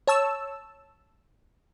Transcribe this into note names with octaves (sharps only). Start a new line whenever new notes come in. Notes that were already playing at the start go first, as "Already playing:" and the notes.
C#5 A5 E6